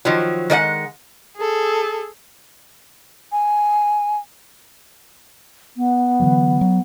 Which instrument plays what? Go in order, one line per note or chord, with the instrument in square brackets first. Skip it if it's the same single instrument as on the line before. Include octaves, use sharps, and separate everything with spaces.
[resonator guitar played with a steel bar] D#3 F3 F#3
D#3 G#3 D5 F#5
[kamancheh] G#4 A4
[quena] G#5
[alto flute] B3
[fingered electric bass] D3 E3 F#3
F#3